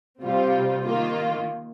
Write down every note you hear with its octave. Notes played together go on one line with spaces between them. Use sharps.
C3 G3 C4 F4
D#3 A#3 F4